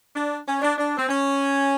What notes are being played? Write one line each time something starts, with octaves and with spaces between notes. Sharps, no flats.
D4
C#4
D4
D4
C4
C#4